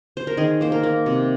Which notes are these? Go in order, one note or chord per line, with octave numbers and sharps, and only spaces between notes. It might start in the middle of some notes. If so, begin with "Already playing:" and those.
C5
A#4
D#3 G#4
A#3 C5
A#4
A#3
C3